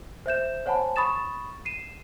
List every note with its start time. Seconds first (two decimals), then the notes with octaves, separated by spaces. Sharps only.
0.26 C5 E5 G6 E7
0.66 C5 C#5 F#5 G#5 A5 B5
0.96 B5 C#6 D#6 A6 E7
1.65 C7 D#7 E7